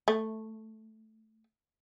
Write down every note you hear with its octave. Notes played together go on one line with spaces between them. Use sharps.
A3